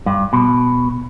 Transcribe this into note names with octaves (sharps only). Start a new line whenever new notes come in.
G2
B2